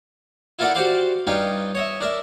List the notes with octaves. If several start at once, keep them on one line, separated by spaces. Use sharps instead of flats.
E4 F4 A4 A#4 D5 F#5
F#4 G4 C5 D5 F5 C6
G2 C#4 D#4 F4 G5
C#5 D#5 E5
D4 A#4 E5